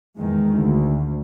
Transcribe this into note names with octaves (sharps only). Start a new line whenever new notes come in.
E2 D#3 G#3
D2